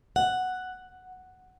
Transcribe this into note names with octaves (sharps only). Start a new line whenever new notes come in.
F#5